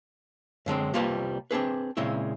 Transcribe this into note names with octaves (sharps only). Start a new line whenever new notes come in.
F#2 D3 G#3 C4
C2 G3 A#3 F4 B4 A5
C4 D4 G#4 B4
A#2 C#3 G#3 C4 E4